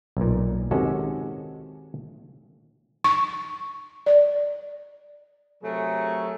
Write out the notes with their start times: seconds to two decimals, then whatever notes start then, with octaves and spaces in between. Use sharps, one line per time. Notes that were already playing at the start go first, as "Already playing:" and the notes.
0.17 B1 A#2
0.71 C3 D#3 G#3 C#4 F#4 A4
3.04 C#6
4.06 D5
5.62 C3 F#3 A3 G#4 A#4